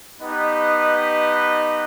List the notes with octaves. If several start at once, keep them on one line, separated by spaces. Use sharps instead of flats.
B3 D#4 G4 B4 D#5